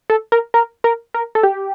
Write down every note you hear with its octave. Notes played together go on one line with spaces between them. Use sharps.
A4
A#4
A#4
A#4
A#4
A4
G4